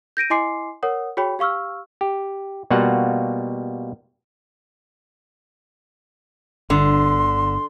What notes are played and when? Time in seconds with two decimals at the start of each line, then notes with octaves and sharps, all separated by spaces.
0.17 G6 A#6 D7 D#7
0.30 E4 D#5 G#5 C6 D6 C7
0.83 A#4 C#5 F#5 D#6
1.17 F#4 G#4 C#5 G5 B5
1.39 G4 F5 C#6 E6 F6
2.01 G4
2.70 B2 G3 A#3 F4 F#4 F#5
6.70 G1 D3 C6